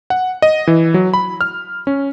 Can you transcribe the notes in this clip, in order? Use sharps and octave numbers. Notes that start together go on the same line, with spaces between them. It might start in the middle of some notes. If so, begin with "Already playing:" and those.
F#5
D#5
E3
F#3
B5
F6
C#4